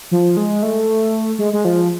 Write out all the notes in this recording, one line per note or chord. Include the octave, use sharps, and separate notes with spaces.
F3
G#3
A3
G#3
G#3
F3